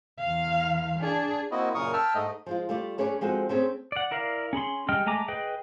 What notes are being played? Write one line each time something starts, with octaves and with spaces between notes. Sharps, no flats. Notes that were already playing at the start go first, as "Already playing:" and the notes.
E2 F5
D4 G#4
A#3 C4 E4 F#4 D#5
F#2 A#2 C#3 A#4 C#6 D#6
E5 G5 A5 E6 F6
G#2 A3 D#5
F3 G#3 F4
G3 A3 F4 D5
A3 C#4 G#4 B4 C#5 D5
F3 G#3 C4 F#4 A4
A3 C4 C#4 G#4
D5 F#5
E4 A#4 D5 F5
C#4 G#4 B5 C6
G3 G#3 D#5 G5 F6
G#3 A3 G#5 A#5 D6
G#4 B4 D#5 G5